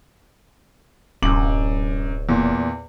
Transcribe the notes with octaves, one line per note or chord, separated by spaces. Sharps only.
D1 F#2 D6 F#7
E2 A#2